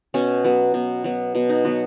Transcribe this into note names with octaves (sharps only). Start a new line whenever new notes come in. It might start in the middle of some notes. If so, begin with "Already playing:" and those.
B2 C#4
F#3 B3
B2
F#3 B3
B2
D#4
F#3 B3 F#4